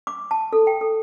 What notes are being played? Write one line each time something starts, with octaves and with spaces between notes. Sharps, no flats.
D6
A5
A4
G5
A4